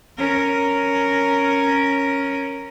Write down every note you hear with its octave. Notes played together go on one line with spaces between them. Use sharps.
C#4 A#4